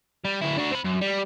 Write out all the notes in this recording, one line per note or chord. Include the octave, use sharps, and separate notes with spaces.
G3
D2 E4
D4 F#4
C4 B5
F#2
G3